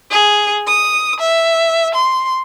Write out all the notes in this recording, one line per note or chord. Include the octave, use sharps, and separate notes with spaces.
G#4
D#6
E5
C6